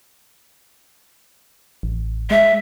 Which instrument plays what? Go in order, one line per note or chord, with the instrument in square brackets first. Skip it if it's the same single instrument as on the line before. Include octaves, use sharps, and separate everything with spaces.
[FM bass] A1
[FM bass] G#3 [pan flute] E5